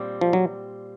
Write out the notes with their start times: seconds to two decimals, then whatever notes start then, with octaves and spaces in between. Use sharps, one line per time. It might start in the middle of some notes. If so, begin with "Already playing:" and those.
Already playing: A#2 G3 C4
0.21 F3
0.33 F#3